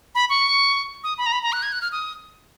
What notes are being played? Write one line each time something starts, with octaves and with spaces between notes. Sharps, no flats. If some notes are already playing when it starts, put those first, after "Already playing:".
B5
C#6
D#6
B5
A#5
B5
A#5
F#6
G#6
F#6
F6
D#6